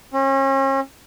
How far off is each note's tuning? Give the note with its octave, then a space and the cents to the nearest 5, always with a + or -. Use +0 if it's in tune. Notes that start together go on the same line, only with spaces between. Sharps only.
C#4 -40